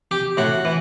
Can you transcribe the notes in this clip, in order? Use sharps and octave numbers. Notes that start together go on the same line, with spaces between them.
G4
A2 F#4
E3